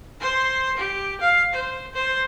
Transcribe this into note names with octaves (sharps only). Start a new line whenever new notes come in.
C5 C6
G4
F5
C5
C5